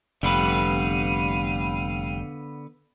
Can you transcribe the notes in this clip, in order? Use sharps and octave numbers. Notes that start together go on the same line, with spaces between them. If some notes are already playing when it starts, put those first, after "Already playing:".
F1 D3 G3 B3 B4 F5 D#7